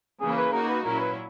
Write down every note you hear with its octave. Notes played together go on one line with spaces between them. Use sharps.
C#3 E3 A#3 C#4 G#4
B4
A#3 D#4 F#4 A#4
B4
A#2 F#3 C#4 E4 A#4
B4